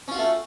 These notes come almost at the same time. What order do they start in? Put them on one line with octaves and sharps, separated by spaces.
C#4 F4 F#4 A3